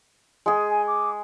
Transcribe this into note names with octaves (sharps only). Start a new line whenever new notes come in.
G#3 G#4
G#5
D6